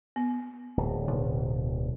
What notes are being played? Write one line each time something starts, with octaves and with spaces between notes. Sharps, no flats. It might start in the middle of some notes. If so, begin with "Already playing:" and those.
B3
D1
B1